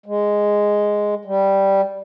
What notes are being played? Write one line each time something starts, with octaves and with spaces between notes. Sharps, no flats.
G#3
G3